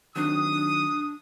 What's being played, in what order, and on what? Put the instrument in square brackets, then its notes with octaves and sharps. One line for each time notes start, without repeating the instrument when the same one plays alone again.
[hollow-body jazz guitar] D#3 F#3 C4 [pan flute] D4 [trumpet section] D#6